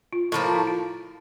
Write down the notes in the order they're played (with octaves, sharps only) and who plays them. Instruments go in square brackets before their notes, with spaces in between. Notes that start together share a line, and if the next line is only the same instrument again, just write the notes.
[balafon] F4
[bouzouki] A2 F3 A#3
[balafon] F4
E4
F4